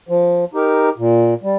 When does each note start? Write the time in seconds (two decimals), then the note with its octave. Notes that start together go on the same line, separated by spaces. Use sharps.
0.09 F3
0.54 D#4 G4 A#4
0.98 A#2
1.43 G3